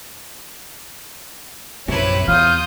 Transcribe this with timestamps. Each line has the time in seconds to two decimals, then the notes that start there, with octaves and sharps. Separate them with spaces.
1.88 A#1 F#2 C3 C4 E4 B4 C#5
2.28 E2 F4 F5 D#6 G6